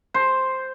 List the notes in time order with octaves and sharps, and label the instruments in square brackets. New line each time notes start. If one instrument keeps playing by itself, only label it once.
[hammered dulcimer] C5